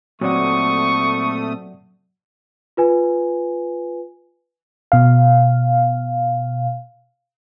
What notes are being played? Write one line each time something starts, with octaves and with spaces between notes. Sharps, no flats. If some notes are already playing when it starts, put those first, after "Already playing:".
A#2 F#3 A3 C4 D5 F#5 C#6 D#6
F4 B4 G#5
B2 F5